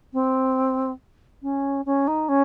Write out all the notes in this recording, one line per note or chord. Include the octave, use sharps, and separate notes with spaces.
C4
C#4
C#4
D#4
C#4